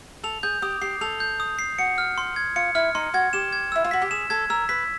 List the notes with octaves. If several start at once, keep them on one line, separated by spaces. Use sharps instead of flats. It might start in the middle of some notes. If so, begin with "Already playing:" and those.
A4 F7
G#4 G6
G4 D#6
G4 C7
A4 F7
G6
D#6
C7
F#4 C#7
F6
C6
G#6
F4 C#7
E4 F6
D#4 C6
F#4 G#6
G4 E7
G#6
E4 E6
F4
F#4 B6
G4
G#4 E7
A4 G#6
A#4 E6
B4 B6